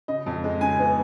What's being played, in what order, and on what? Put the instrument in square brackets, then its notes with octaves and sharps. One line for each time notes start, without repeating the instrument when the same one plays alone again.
[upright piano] C#3 D#5
F2
G#3
C#3 G#5
B3